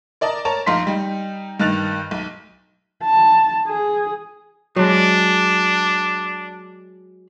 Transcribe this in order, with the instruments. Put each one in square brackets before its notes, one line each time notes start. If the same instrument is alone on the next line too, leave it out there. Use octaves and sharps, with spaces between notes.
[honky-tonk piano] A#4 D5 D#5 A5
A#4 C#5 A5
A#1 D#4 F5 C6 B6
G3 D#4
G2 D#3 D#4 F#6 A6 F7
B1
[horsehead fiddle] A5
G#4
[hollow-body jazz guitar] F#3 G#3 [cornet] D4